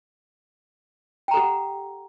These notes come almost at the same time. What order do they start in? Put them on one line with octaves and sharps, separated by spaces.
G5 A#5 A4 G4 F#5